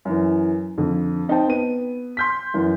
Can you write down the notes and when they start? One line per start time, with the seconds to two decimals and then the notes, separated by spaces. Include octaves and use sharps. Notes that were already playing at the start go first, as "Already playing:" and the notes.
0.05 F#2 E3
0.78 F2 D3
1.28 C4 D#4 C5 G5 A5
1.48 B3 D#7
2.17 C6 G6 B6
2.54 F#2 E3